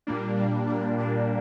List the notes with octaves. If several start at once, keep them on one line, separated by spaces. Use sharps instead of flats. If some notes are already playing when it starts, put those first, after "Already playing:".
A#2 G3 A#3 D4
A#2 G3 A#3 D4
A#2 G3 A#3 D4
A#2 G3 A#3 D4